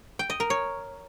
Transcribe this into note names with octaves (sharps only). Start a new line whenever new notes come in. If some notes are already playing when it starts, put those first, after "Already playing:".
G5
D#5
A#4
C#5